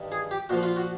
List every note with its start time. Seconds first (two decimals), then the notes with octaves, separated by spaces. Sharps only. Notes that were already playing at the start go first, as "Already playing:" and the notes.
Already playing: G2 D#3
0.12 G#4
0.31 G4
0.49 A#2 F3 F#4
0.63 F4
0.76 F#4